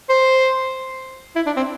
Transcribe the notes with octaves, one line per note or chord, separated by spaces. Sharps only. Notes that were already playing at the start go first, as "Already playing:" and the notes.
C5
E4
D4
C4